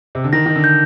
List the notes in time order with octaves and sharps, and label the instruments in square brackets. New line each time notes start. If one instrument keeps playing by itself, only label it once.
[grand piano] C3
D3
[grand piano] D#3 [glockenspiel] A#6
[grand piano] D#3
D3
[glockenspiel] G6